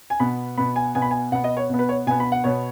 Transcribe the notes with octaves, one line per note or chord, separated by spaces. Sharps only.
G#5
B2 B3 B5
B2 B3 B5
G#5
B2 B3 G#5
B5
G#5
B2 B3 F#5
D#5
C#5
B2 B3
B4
C#5
B2 B3 G#5
B5
F#5
B2 B3 C#5